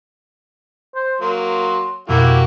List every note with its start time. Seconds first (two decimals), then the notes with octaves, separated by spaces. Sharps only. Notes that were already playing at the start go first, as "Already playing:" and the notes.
0.95 C5
1.21 F#3 A#3 C6
2.09 F2 B2 A#3 E4 F#4 G4